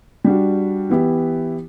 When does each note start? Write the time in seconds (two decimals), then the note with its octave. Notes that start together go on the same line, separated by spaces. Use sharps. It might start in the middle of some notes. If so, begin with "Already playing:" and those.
0.24 G3 D4 F#4
0.89 E3 B3 E4 G4